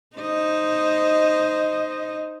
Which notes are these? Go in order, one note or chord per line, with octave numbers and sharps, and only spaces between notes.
D#4 C5 D#5